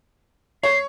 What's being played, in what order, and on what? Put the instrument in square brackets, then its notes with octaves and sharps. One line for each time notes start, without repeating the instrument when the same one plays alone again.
[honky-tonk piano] C#5 [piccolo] C7